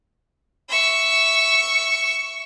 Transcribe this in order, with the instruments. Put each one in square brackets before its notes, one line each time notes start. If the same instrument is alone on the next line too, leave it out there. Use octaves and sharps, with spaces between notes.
[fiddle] E5 C#6